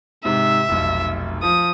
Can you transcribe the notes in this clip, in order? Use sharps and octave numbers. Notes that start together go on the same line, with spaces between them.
G#2 C3 E5
F1 B1
F3 D#6